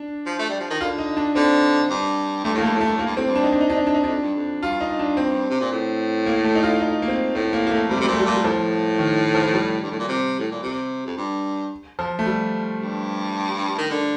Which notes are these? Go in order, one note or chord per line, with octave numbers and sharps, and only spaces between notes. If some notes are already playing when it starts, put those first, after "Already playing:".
Already playing: D4
F3
A3
G3
F3
D#3
D3 F4
D#4
D4
D3 C4
G2
G2 A3
A2 A#3
G2 A3
A2
A3
G2
A2 A#3
G2
A2 C4
G2
D4
D#4
D4
D#4
D4
D#4
D4
D#4
F2 D4
G2
F2
G2 F4
D#4
D4
C4
C3
A#2
A2
A#3
A3
D#4
F4
D#4
A#3
C4
A2 C4
A#3
A#3
A3
C3 G3
A3
C3
G3
A#2 A3
G3
A#2 A3
G3
A2 F3
D#3
F3
G3
G2
A2
A#2
C3
A2
A#2
C3
F2
G2
F3
A3
G3
G2
D#3
D3